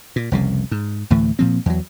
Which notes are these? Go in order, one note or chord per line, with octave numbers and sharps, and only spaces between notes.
A#2
F1 C2 C#3
G#2
D2 A2 E3 A3
A#2 F3 C4
E2 F#3